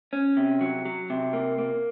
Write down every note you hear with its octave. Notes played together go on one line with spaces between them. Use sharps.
C#4
C3
F#3
F#3
C3
A#3
A#3